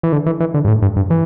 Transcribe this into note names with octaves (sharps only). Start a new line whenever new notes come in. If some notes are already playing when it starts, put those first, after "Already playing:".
E3
D3
E3
E3
D3
G2
A2
G2
G2
E3